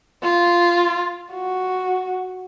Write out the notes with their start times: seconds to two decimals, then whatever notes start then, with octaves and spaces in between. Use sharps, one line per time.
0.23 F4
1.33 F#4